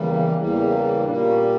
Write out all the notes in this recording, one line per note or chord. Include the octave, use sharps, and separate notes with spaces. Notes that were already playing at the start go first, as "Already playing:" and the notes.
Already playing: E2 C#3 E3 G3 A#3
E2 C#3 E3 G3 A#3
A#2 G3 A#3 D4
C#4